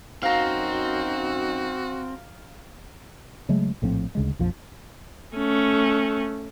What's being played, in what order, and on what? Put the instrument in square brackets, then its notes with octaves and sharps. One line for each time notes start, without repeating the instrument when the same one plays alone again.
[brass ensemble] F#2 D#4 [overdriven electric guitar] C4 [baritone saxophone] F#4 [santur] F5 A#5
[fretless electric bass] C#3 F#3 G#3 A3
A#1 A2 F3 C4
D2 C#3 G#3
A#1 F2 F3
[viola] A3 C#4